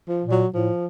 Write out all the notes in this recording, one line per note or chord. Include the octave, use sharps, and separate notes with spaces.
F3
A#2
F#3
A2 F3